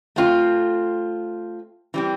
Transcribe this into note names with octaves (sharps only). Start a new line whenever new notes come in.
A3 C4 F4
E3 G3 C4